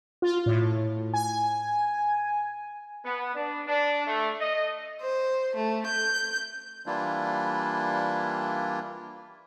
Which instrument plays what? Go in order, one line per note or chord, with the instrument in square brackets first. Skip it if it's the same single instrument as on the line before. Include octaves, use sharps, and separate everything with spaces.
[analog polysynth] F4
A2
G#5
[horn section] B3
D4
D4
A3
D#5
[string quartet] C5
A3
G6
[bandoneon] E3 G3 A#3 D4 E4 F4